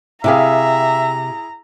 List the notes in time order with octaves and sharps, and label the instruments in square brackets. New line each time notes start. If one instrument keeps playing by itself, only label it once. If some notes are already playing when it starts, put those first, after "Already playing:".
[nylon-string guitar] C3 G4 F5 [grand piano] E4 G#4 [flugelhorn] E5 [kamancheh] A#5